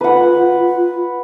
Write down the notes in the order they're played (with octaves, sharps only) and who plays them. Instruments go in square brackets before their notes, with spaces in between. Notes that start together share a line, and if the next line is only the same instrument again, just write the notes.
[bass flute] F4 [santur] B4 F#5